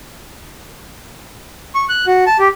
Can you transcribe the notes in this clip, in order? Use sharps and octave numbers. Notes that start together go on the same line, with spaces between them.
C#6
F#6
F#4
A5
G4